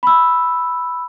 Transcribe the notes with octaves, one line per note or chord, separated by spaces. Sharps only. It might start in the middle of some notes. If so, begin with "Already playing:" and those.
B5 E6